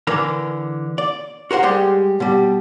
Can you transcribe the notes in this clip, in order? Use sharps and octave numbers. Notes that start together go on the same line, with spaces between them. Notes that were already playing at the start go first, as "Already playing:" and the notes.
D3 E3 A#4 B5
D5
F#4 A#4 C5 F#5
G3 G#3 G4
B2 G3